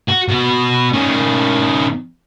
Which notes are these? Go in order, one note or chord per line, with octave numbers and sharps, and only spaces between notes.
F#4
B2 F#4
D#3 C#4